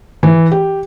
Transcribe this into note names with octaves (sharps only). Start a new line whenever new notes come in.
E3
G4